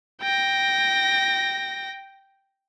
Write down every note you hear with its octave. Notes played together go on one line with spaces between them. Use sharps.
G5 A#6